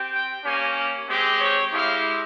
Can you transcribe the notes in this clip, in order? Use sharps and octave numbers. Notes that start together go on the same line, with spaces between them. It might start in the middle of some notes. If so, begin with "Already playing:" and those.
Already playing: C4 G4
G5
A#3 C#4 G4 G#5
G#3 C4 G4
C#5
G#3 E4 G4 F5